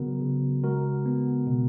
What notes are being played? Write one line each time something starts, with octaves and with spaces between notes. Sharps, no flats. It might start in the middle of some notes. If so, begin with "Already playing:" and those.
Already playing: C#3 F#3 B3 F#4 A#4
C#3
G#3 F#4 A#4
B3
B2